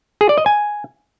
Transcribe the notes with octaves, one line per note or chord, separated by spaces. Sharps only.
G#4
D5
D#5
G#5